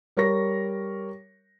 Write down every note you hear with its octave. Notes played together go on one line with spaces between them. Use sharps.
G3 A#4 C#5 C#6 A#6